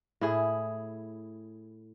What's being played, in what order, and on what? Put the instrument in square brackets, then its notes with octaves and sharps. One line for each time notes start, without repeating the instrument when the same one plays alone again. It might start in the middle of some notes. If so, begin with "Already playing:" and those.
[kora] A2 E4 G#4